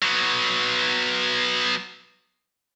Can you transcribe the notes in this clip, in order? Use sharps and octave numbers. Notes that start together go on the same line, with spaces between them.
F#3 B3